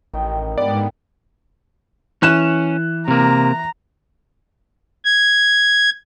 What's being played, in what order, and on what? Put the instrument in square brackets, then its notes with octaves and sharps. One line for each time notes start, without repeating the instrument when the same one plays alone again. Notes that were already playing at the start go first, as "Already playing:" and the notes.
[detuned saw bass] A1 [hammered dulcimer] D#3 D#5 G5
[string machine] G#2 [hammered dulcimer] D3 F3 G3 [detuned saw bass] B3 [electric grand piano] D5
[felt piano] E3 F#6 E7 [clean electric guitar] C#4
[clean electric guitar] C3 A#3 [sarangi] A#5
[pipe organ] G#6